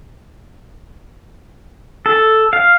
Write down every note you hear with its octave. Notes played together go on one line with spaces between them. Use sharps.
A4
F5